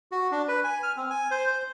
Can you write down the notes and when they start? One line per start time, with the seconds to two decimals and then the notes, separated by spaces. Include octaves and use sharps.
0.12 F#4
0.31 D4
0.48 B4
0.64 G#5
0.83 F6
0.97 C4
1.10 G#5
1.31 C5
1.47 C5